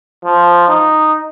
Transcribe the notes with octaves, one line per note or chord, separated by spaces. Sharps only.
F3
D#4